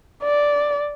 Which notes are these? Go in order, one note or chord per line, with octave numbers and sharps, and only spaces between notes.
D5